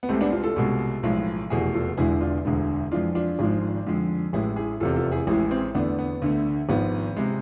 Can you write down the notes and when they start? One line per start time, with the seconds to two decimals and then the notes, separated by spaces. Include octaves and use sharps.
0.03 B3
0.09 C2 C3 G#3 A3 C4
0.21 B3 D4
0.32 D4 F4
0.44 F4 A4
0.56 C2 B2 G#3
1.03 B1 A2 F3 G#3
1.50 F1 E2 B2 A3 E4 G#4
1.74 F4 A4
1.97 E1 E2 D3 G#3 E4 G#4
2.21 D4 F4
2.45 E1 D2 D3 G#3
2.91 F2 E3 G#3 D4 F4
3.15 D4 F4
3.39 G#1 G#2 F3 G#3
3.87 F2 D3 F3 G#3
4.33 A1 A2 G#3 E4 G#4
4.56 E4 G#4
4.80 F1 E2 C3 F4 A4
4.96 F4 A4
5.12 E4 G#4
5.27 A1 A2 E3 G#3 E4 G#4
5.51 C4 E4
5.75 E2 D3 A3 B3 D4
5.99 B3
6.22 D2 D3 A3
6.69 G#1 G#2 F3 B3
7.17 C3 G#3